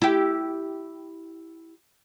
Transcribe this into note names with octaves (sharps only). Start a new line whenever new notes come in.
E4 G4